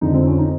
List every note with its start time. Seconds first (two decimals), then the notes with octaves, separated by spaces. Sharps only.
0.01 F2 D3 F3 D#4
0.14 C4
0.26 C#4
0.38 D#4